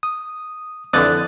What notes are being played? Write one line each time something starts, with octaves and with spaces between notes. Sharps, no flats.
D#6
F2 D3 E3 D#6 F#6 A6